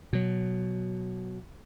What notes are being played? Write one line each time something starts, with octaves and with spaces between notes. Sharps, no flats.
B2 F#3